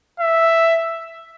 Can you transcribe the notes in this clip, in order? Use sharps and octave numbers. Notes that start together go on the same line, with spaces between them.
E5